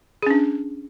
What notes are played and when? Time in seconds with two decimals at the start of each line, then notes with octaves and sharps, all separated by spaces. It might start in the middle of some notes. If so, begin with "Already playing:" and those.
0.23 G#4
0.27 C#4
0.31 D4